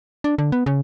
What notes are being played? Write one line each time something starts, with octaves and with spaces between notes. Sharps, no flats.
D4
D3
B3
C#3